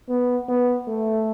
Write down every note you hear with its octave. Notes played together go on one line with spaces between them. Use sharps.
B3
B3
A3